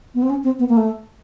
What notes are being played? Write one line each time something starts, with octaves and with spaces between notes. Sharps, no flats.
B3
C4
C#4
C4
B3
A#3
A3